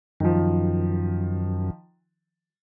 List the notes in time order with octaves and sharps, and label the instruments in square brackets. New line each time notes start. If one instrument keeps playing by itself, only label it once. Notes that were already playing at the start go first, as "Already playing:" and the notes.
[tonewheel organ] F#2 [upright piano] D#3 F3